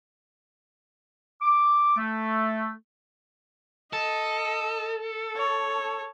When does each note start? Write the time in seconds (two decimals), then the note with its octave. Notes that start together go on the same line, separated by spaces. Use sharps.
1.42 D6
1.97 A3
3.93 A4 D#5
5.37 C#5 A5